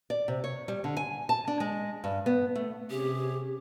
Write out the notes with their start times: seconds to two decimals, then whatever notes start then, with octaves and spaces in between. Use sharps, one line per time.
0.10 D5
0.28 C3
0.44 C#5
0.68 G3
0.84 D3
0.97 G#5
1.29 A5
1.48 D4
1.60 G#3
2.04 G2
2.26 B3
2.56 A3
2.90 C3 C#4 G4 G#4